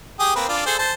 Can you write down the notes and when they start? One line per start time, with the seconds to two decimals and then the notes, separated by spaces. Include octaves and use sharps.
0.20 G4 G#4 D#6
0.36 A#3 C4 B4
0.49 D4 F4
0.66 G#4 A4 C5
0.78 C5 A5